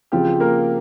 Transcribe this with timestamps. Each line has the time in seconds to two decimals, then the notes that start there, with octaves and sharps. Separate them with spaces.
0.12 C#3 F3 C4 F4 G4
0.40 A#3 A#4